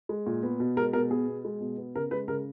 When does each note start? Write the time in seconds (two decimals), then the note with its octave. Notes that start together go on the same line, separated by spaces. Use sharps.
0.09 G#3
0.26 A#2
0.43 B3
0.60 B2
0.77 G#3 A#4
0.93 B2 A#4
1.11 B3 G#4
1.28 B2
1.45 G#3
1.61 B2
1.78 B3
1.95 C#3 A#4
2.11 G#3 B4
2.28 C#3 A#4